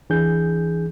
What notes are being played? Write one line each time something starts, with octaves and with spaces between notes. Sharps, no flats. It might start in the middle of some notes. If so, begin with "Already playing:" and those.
C#2 E3 D4 G#4 G6